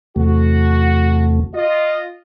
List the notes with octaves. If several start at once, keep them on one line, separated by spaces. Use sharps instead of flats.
E2 C3 A3 F#4
F4 D#5